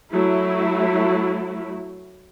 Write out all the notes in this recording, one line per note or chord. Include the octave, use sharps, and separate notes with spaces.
F#3 A3 E4